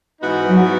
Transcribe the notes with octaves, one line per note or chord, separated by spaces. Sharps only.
G#2 E3 B3 D#4 F#4
F#3